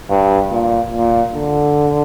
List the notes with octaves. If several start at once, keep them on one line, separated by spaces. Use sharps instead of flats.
G2
A#2
A#2
D3